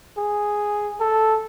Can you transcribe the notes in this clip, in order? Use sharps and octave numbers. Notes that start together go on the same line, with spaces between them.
G#4
A4